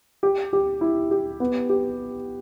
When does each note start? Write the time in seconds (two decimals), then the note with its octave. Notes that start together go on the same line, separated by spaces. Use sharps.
0.23 G4
0.53 G4
0.81 E4
1.11 G4
1.40 B3
1.69 G4